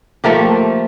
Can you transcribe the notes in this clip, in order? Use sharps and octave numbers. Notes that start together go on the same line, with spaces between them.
F3 A3 A#3 G4